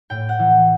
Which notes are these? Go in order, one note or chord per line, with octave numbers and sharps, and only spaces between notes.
A2 G5
F#5
E3